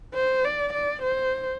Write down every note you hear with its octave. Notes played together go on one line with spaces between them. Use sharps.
C5
D5
D5
C5